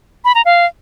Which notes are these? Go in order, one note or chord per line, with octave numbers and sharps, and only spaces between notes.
B5
A#5
F5